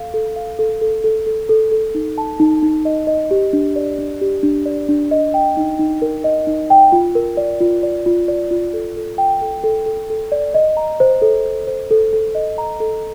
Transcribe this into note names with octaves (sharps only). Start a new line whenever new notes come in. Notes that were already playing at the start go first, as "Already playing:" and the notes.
Already playing: A4 F5
A4
F5
A4
A4
A4
A4
A4
A4
D#4
A5
D#4
D#4
D#5
D#5
G4
D4
D5
D4
G4
D4
D5
D4
D#5
G5
D#4
D#4
A#4
D#5
D#4
G5
F4
A#4
D5
F4
D5
F4
D5
F4
A4
A4
G5
A4
A4
A4
A4
D5
D#5
A#5
C5
A4
C5
C5
A4
A4
D#5
A#5
A4